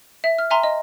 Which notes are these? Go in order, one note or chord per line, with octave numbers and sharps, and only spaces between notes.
E5
F6
E5 G#5 A#5 C6
D#5